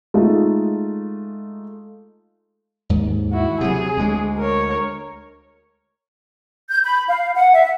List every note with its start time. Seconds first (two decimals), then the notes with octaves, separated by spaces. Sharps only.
0.14 G#3 A3 D#4 F4
2.89 D#2 G#2
3.32 E4 F#4
3.61 C3 F#3 G#4
3.97 D2 G#3
4.38 A#4 C#5
6.71 G6
6.83 B5
7.07 F5
7.35 F#5
7.53 E5